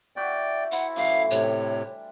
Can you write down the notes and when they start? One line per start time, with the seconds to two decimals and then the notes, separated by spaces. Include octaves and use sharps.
0.16 E4 F#4 D5 E5 G5
0.72 E4 C5 F#5 A5 A#5
0.96 F#2 A2 E3 F5
1.31 A2 C3 G3 D4 C#5